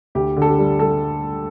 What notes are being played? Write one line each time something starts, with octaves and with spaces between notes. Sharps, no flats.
D2 G4
D3
A4
G4
G3
G3 A4